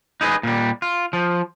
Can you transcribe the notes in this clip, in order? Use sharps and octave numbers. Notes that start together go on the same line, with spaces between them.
D#4 E4 G#4 B4 D#5
A#2 G3
F4
F3